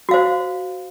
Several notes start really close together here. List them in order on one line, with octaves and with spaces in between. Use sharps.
F#4 F5 C5